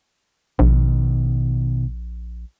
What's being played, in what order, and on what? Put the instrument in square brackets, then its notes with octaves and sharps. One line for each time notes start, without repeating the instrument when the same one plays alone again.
[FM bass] A#1 [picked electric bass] B2 D#3